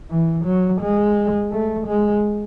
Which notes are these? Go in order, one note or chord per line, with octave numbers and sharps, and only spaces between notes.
E3
F#3
G#3
A3
G#3